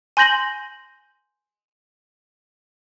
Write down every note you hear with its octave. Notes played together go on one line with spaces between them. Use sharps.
G#5 C6 G6 A#6 F#7